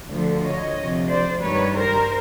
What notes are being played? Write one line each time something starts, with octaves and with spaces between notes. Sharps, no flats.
D2 D3 F3
C#5 D#5
D2 C3 F3
C5 D5
G2 D#3 G3 B4 C#5
A#4 C5